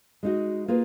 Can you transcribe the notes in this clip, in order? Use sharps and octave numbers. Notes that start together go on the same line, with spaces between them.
G#3 D#4 F#4
A#3 F4 G#4 B4